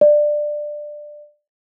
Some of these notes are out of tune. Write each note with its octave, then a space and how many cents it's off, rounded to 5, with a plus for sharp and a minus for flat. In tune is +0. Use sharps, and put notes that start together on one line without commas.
D5 +15